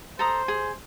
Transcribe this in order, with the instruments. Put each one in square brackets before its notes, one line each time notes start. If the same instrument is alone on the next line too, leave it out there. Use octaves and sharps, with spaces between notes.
[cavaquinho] A4 A#5 D#6 [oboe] C5
[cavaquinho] G#4